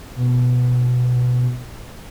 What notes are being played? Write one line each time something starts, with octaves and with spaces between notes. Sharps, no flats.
B2